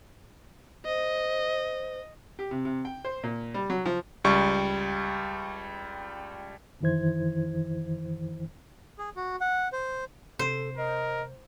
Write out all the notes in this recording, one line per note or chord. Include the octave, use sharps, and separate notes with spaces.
C5 D#5
G4
C3
C3
G5
C5
A#2
G3
F#3
F3
C#2 G3 C#6
F#2 D#3 E3 E4 C5 G#6
G#4
F#4
F#5
C5
C3 A4 C5
A#4 D#5